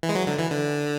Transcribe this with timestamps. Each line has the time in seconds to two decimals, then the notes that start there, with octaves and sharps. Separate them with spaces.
0.03 E3
0.09 G#3
0.15 F#3
0.27 D3
0.39 E3
0.50 D3